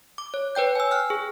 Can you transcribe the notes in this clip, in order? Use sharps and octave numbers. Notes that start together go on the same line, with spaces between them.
D6
C#5
B4 C#5 G5 G6
G#5 E6
G5 F6 F#6
G#4